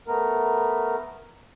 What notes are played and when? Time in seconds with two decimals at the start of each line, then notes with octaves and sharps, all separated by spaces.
0.08 A3 B3 A#4